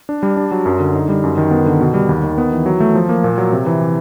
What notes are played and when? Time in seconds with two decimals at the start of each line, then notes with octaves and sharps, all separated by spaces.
0.09 D4
0.23 G3
0.37 D4
0.52 F#3
0.66 F#2
0.80 D3
0.95 D#4
1.09 G3
1.24 F#2
1.38 D#3
1.51 B3
1.66 D3
1.81 B2
1.94 G3
2.09 D#2
2.24 D#3
2.38 B3
2.52 E3
2.66 F#3
2.80 A3
2.95 F3
3.09 A#3
3.24 A#2
3.38 F#3
3.53 C3
3.66 E3